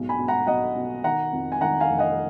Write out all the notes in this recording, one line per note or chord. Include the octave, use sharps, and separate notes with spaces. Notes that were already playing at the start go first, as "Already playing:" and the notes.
Already playing: B1 G#2
G#5 B5
B2
F#5 A#5
B1 D#5 F#5
B2
D#3 F#5 A#5
F2
G#5
D#3 F#5 A#5
F5 G#5
F1
D#5 F#5